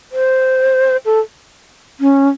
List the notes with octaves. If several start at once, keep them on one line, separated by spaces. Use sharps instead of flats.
C5
A4
C#4